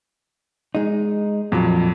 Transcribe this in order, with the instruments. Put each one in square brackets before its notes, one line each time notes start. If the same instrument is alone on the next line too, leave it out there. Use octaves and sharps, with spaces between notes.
[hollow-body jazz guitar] G#3 D#4
[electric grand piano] F2 F#3 [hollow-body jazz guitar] A#2 F3